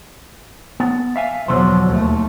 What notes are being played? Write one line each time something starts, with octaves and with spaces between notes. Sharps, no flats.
B3
E5 F5 G#5
E2 B2 D3 F3 F#3 C5
D#2 A3